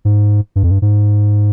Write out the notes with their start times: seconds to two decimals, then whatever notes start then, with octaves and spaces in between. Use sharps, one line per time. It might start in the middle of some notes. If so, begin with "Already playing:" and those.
0.05 G#2
0.56 G2
0.63 F2
0.71 G2
0.82 G#2